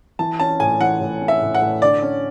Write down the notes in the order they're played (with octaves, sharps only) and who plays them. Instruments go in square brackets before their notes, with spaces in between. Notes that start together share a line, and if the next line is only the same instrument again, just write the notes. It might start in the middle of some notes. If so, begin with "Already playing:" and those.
[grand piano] E3 [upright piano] A5
[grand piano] C#4 [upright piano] A5
[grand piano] A2 [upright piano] G#5
[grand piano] E3 [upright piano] F#5
[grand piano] A2
C#4
[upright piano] E5
[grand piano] A2
[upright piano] F#5
[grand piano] A2
[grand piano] D3 [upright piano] D5
[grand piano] C#4